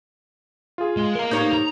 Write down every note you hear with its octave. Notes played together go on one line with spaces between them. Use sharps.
F4 G#4
G#3
A#4 F5
D#4 G4 C#5 G6
A#5